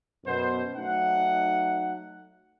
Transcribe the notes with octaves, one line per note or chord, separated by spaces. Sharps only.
F#2 B2 B3 C5
F#3 A3 D#4 F#5